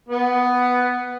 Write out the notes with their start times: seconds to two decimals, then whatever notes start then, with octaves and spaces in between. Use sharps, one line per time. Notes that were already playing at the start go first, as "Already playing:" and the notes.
0.09 B3